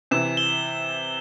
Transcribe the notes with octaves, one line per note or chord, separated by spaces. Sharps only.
C3 E3 E7
G7